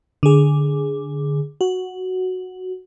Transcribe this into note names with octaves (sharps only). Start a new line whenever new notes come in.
D3 G#4
F#4